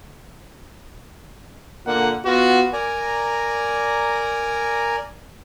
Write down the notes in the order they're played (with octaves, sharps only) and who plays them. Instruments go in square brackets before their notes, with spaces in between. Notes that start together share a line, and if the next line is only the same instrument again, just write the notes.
[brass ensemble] A#2 D3 A#3 F#5
B3 F4 F#4
[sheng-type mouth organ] A#4 D5 G#5 A#5